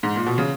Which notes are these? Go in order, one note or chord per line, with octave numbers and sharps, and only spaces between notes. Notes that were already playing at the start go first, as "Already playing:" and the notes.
G#2
A#2
B2
C#3